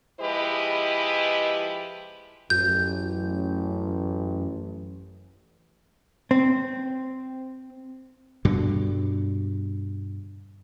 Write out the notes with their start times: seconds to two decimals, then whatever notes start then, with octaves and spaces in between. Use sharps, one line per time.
0.20 F3 G#3 E4 G4 B4 D#5
2.50 A1 F#2 G6
6.31 C4
8.45 G2 B2 D3